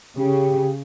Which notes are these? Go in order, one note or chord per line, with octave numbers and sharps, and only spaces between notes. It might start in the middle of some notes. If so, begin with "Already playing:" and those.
C#3 G4